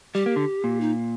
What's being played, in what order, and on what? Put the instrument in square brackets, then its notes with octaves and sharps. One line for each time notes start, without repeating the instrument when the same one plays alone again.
[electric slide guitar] G3 [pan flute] G4
[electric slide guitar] A#3
D3
A#2
[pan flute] D#4